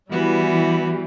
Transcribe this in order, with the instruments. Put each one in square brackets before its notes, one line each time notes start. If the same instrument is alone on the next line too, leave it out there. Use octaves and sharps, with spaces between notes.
[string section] E3 G3 [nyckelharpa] B3 F#4